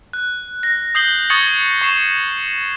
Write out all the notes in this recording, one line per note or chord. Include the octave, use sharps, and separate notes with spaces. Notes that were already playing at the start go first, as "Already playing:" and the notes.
F#6
A#6
D#6 G6 C7 F#7 G7
C#6 D#6 G#6 A6 C#7 F#7
C#6 C7 E7